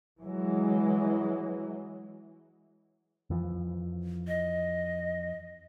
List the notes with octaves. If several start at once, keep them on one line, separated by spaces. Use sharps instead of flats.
E3 F#3 G#3
F2 E3 F3
D#5